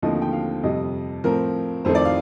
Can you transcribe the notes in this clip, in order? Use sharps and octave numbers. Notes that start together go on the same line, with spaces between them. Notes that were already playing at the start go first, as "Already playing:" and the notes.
D#2 D3 F3 A3 C4 D#5
G5
F5
F2 C3 G3 D#5
A2 F3 C4 A#4
F2 D#3 A3 C4 C5
D5
F5